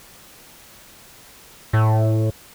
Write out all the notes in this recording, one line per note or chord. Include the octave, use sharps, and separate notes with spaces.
A2